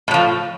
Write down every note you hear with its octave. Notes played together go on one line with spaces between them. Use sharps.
A2 F3 F#3